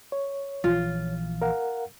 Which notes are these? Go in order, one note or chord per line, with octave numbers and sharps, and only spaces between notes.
C#5
A#1 E3 F4
A#4 F5 F#5